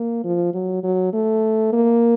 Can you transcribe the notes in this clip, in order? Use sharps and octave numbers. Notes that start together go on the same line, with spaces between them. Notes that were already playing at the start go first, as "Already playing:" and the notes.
Already playing: A#3
F3
F#3
F#3
A3
A#3